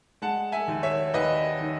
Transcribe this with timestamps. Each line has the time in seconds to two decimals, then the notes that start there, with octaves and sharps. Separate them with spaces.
0.22 G#3 F#5 A5
0.52 E5 G#5
0.68 D#2
0.83 C#5 E5
1.14 D#2 B4 D#5
1.60 D#3